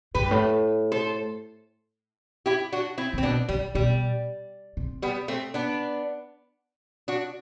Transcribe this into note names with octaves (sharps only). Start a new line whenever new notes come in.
A2 G4 B4
G2
A2
A4 C5
E4 G4
D4 F#4
C4 E4
C3 C4
B2 B3 D4
C3 G3
B2 G3
C3
G3 B3
A3 C4
B3 D4
D4 F#4